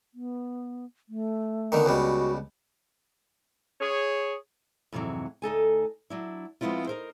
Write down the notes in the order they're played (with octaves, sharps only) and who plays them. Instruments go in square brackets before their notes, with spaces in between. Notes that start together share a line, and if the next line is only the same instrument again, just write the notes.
[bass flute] B3
A3
[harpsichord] B2 D3 D#3
[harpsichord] C#2 B2 G3 [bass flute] F#4
[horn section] G#4 C#5
[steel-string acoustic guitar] F2 G#2 C3 E3 F#3
D2 D#4 A4 G#5
F#3 D4 E4
F3 G#3 B3 C4 E4 F4
D#4 A#4 C5